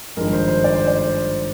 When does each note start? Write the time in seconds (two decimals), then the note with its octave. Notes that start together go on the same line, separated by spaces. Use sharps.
0.17 G#1 G2 F3 G#3 A#4
0.33 C5
0.48 C5
0.64 D5
0.75 C5
0.88 D5
0.98 C5